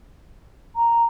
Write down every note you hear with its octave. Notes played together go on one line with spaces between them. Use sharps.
A#5